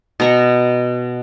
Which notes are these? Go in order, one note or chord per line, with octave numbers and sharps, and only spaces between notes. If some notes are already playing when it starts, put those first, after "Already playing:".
B2 A#5 C#6